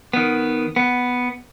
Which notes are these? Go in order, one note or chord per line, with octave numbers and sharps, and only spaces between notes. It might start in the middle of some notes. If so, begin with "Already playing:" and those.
D#3 B3
B3